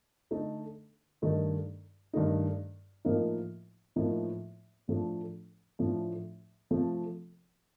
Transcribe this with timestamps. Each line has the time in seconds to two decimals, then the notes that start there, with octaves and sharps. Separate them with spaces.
0.31 D3 A3 D#4
1.22 G2 D#3 A3 D#4
2.13 G2 D#3 A3 D#4
3.05 A2 F3 A#3 D#4
3.96 A2 F3 A#3 D#4
4.88 A2 F3 A3 D4
5.79 A2 F3 A3 D4
6.70 C3 F3 A3